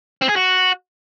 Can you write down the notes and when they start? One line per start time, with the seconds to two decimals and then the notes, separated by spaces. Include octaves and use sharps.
0.22 C4
0.29 G#4
0.36 F#4